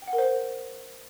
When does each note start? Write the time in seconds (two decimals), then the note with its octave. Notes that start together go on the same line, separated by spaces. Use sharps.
0.02 G5
0.07 F#5
0.13 A#4
0.18 C5